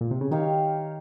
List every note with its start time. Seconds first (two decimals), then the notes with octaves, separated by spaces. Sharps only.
0.01 A#2
0.11 C3
0.21 C#3
0.31 D#3 D#4 G4 C#5 F5